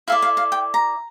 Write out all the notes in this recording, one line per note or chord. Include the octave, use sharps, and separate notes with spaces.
E4 A4 D5 F5
F5
F5
G5
A#5